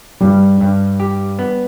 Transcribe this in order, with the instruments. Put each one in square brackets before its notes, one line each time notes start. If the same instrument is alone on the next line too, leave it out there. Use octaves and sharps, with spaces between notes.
[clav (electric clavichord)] G2 [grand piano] G3
[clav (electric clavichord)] G2
G4
B3